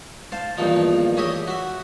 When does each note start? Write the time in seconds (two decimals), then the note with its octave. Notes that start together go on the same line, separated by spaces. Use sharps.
0.32 C5 F5 A5
0.57 E2 G2 A#2 D#3 F3 D#4
1.17 G4 G#4 C#5 D#5 E5
1.47 F#4 E5